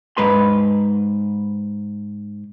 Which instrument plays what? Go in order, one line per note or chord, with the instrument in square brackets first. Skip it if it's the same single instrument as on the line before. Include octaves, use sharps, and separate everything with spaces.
[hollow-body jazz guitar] G#2 B4 C6